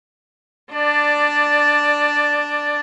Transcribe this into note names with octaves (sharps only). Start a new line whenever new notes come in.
D4 D5